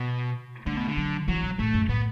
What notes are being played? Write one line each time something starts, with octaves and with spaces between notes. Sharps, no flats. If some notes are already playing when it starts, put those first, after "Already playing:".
Already playing: B2
D3 A3
B2
D3
F#3
E3 F#3
B2
A2 A3
F#2
A2 B3